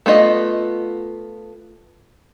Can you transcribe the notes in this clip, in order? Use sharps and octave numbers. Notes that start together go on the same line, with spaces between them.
A3 B3 F4 D#5